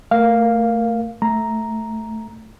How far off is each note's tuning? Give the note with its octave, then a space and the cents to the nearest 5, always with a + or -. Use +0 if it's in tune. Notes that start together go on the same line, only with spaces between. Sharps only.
A3 +25 A#4 +10 F5 +0
A3 +0 A#5 +0